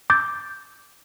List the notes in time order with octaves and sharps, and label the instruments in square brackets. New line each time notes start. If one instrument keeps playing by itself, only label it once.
[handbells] D6 E6 G6 A6